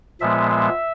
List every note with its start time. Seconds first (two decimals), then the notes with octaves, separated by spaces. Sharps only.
0.21 A#2 F3 G#3 B3 E5
0.51 E5